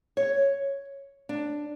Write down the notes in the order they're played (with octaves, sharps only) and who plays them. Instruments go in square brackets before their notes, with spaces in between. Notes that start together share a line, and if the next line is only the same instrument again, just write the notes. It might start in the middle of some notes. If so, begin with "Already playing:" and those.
[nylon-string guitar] C#5
D4